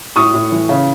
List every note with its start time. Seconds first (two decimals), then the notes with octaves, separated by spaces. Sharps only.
0.16 A2 C#6 D#6
0.34 A2
0.52 E3
0.69 C#3